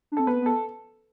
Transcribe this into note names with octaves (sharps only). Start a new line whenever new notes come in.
D4
C4 A4
B3 B4
B3
A4